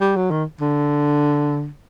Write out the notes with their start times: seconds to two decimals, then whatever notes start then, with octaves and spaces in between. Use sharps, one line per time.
0.01 G3
0.16 F#3
0.31 D#3
0.60 D3